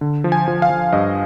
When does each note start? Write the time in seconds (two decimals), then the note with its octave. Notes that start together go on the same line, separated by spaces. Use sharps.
0.01 D3
0.24 F3
0.32 G#5
0.48 F3
0.62 F5
0.70 F3
0.93 G2 D#5